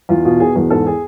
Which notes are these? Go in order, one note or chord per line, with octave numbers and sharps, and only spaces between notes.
E2 F4
B2 F4
B2 G#4
E2 G#4
G#2 A4
G#4